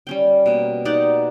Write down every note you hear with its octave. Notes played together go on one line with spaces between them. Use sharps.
G3 C#4 G5
B2 A#3
D#4 G4 D5 F#5